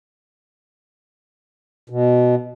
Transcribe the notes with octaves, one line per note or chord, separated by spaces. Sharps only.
B2